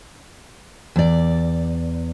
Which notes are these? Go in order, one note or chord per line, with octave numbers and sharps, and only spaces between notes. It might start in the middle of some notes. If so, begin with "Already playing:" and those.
E2 D5